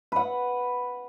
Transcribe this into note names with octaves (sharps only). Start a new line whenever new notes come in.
B4 F#5